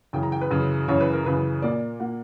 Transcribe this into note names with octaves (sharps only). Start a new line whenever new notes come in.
F#2 C#3 E3 G5
A#5
G5
B4
F#2 C#3 E3
F#2 C#3 E3 C#5
B4
A#4
F#2 C#3 E3 B4
A#2 A#3 D5
A#2 A#3 F#5